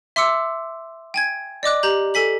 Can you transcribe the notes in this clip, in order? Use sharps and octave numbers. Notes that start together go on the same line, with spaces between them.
E5 C6 D6 E6 C#7
G5 G#5 G#6
D5 D#5 D6 F#6
G4 A#5 G6 F#7
A4 G#5 B6 F#7